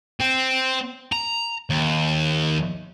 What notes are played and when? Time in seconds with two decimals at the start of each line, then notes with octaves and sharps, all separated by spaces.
0.20 C4
1.12 A#5
1.70 D#2